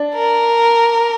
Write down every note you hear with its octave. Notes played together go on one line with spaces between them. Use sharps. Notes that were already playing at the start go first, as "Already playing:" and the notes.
Already playing: D4
A#4